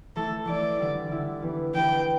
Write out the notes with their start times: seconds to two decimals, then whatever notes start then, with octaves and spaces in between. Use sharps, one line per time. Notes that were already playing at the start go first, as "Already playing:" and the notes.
0.16 E3 A3 E4 A4
0.47 E3 A3 E4 D5
0.80 D3 G3 E4
1.11 D3 G3 E4
1.42 E3 B3 G4 B4
1.75 E3 B3 G4 B4 G5